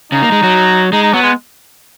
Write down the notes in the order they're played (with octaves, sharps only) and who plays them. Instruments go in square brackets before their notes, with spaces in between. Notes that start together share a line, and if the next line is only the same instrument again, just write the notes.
[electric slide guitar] C#3 [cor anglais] D#4
[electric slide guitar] A#3
G#3
F#3
[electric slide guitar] G#3 [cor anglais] D#4
[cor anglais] D#4
[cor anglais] F#3 [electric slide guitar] B3
[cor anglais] G#3